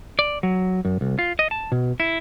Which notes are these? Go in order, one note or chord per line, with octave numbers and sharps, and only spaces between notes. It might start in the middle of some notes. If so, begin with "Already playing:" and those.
D5
F#3
F#2
C2
F4
D#5
A5
B2
E4